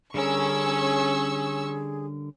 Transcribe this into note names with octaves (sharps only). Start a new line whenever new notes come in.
D3 G3 C#4 G#4 A#4 C#6 E6